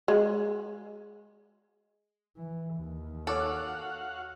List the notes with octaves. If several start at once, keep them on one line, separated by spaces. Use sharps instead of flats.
G#3
E3
D#2
F#4 A4 C#5 F5 F#5 C#6 D6